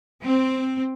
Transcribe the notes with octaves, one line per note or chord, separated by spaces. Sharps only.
C4